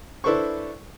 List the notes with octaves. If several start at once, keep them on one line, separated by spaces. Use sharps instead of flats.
D4 E4 A4 B4 C5 C#6